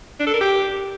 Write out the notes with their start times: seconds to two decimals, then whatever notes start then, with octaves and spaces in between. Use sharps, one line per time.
0.20 D4
0.27 A4
0.34 A#4
0.41 G4